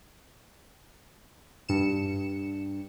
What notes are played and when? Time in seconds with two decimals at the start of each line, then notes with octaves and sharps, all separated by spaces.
1.69 G2 C#7 E7